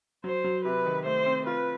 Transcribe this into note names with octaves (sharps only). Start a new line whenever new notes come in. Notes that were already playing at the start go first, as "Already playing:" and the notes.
F#3 C5
F#3
C3 B4
D#3
A3 C5
C4
F4 B4